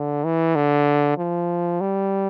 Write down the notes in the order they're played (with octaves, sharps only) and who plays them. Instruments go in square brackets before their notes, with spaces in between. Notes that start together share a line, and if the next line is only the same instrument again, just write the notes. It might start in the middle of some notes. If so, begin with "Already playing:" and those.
Already playing: [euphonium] D3
E3
D3
F3
G3